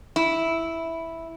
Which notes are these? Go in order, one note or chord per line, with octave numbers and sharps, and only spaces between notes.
E4